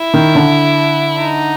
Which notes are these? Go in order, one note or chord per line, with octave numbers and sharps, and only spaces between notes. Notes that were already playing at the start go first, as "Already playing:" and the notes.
Already playing: E4
D#3
D3
D#4